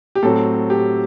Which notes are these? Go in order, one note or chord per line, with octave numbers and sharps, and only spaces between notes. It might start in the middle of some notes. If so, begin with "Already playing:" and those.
G4
A2 F#3 C4 A4
G4